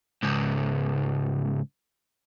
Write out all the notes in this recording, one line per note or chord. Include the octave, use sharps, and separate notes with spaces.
C#2 G#2